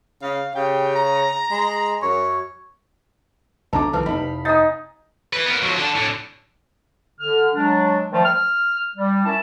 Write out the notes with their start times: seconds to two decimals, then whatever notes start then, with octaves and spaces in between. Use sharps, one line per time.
0.23 C#3 F5
0.56 C#3 G4 G5
0.96 A#5
1.51 G#3
2.03 F#2 C#5
3.73 B1 D3 D4 A4 A5 A#5 D6
3.93 C2 D#3 F3 E4 B4 F5 A5
4.06 F1 C3 D#4 B5
4.45 D#4 D5 F#5 G#5 D#6 A6
5.33 E4 B4
5.46 B3 A#4
5.62 F3 F#3
5.76 D3 A4
5.96 A2 D3
7.20 D3 F6
7.54 F#3 G#3 D4
8.12 D#3 F3 G3 A3
8.25 F6
8.96 G3
9.25 C#4 E4 A#4 E5 A5